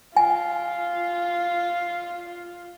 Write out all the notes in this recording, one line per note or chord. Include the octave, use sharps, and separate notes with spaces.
F4 G#5